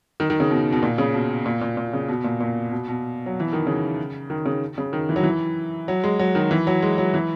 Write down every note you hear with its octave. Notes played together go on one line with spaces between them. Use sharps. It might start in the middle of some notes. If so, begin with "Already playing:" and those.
D#3
D#3
C#3
B2
B2
A#2
C#3
B2
A#2
A#2
A#2
C#3
B2
A#2
A#2
B2
B2
F#3
E3
D#3
C#3
D#3
C#3
C#3
D#3
E3
F#3
E3
F#3
G#3
F#3
D#3
E3
F#3
G#3
F#3
E3